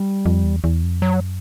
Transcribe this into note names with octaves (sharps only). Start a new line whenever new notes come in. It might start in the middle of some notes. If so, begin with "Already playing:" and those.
Already playing: G3
F2
E2
E2
F2
F#2 F#3